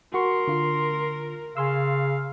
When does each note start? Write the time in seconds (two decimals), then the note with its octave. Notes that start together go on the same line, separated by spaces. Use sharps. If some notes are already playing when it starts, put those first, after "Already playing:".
0.14 F#4 A#4 C6 C#6
0.48 D3 F4
1.57 C#3 F5 G#5 C6 E6